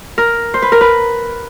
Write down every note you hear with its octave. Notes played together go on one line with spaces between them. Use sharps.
A#4
C5
B4
A#4
B4